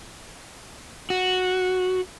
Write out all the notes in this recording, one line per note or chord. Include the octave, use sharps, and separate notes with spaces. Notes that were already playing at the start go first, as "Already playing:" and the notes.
F#4